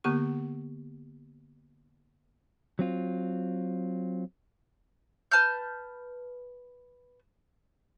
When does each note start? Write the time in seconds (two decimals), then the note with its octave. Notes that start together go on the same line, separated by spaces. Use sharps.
0.04 D3 A#3 B3 G4 C#6
2.79 F#3 C4 F4
5.31 B4 A5 F6 G6